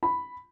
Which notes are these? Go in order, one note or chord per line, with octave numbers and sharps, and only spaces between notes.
B5